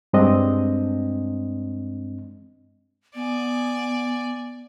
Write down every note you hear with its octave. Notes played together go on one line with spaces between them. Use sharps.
G2 G#3 C4 D4 D#5
B3 D5 G#5